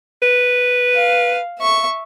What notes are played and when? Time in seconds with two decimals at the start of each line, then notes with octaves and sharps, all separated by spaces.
0.22 B4
0.95 F5
1.59 E5 C#6